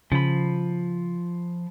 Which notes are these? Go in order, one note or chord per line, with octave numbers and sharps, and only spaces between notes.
C#3 F3 B5